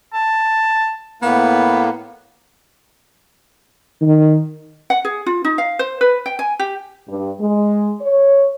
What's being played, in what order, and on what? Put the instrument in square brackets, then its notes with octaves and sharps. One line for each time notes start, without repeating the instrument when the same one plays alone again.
[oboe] A5
[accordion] A2 A#3 [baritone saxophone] B3
[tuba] D#3
[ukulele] F#5
G#4
F4
D#4
F5
C5
B4
G5
G#5
G4
[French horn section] G2
G#3
C#5